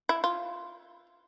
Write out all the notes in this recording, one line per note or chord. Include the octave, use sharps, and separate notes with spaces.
E4
F4